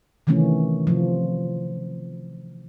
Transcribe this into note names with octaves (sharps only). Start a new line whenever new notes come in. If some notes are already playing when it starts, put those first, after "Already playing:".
C3 D#3 E3 A3 C#4
C3 F3